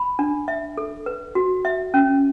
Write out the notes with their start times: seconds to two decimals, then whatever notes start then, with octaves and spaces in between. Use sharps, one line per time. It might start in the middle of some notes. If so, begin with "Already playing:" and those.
Already playing: B5
0.19 D4
0.48 E5
0.78 A4
1.06 B4
1.35 F#4
1.65 E5
1.94 C#4